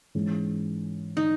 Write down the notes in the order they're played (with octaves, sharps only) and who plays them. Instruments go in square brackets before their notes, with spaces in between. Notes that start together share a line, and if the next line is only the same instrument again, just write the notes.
[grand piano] G#2 E3 G#3 C#4
[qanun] D#4